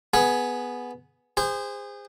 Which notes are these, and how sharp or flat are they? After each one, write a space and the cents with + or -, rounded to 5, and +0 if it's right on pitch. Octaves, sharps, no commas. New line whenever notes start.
B3 +0 G#4 +10
G#4 -30 C5 -15